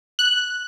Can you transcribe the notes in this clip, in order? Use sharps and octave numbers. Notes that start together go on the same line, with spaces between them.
F#6